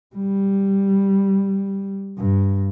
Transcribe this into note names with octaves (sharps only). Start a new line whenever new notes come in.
G3
G2